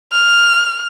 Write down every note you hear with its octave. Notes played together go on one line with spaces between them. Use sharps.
F6